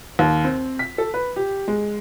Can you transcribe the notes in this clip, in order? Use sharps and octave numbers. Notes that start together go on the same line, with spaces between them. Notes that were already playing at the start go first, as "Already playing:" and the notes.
D#2
C4
B6
A4
B4
G4
G#3